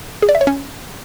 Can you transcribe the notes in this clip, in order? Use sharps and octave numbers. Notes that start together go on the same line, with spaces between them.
G#4
D5
E5
C#5
C#4